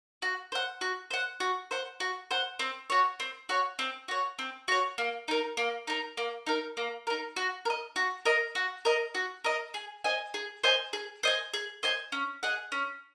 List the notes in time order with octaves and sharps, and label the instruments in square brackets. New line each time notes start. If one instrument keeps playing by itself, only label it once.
[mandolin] F#4
C5 F#5
F#4
C5 F#5
F#4
C5 F#5
F#4
C5 F#5
C4
F#4 C#5
C4
F#4 C#5
C4
F#4 C#5
C4
F#4 C#5
A#3
D#4 A#4
A#3
D#4 A#4
A#3
D#4 A#4
A#3
D#4 A#4
F#4
A#4
D#5
F#4
A#4 D#5
F#4
A#4 D#5
F#4
A#4 D#5
G#4
C5 D#5 G#5
G#4
C5 D#5 G#5
G#4
C5 D#5 G#5
G#4
C5 D#5 G#5
C#4
G#4 D#5 F#5
C#4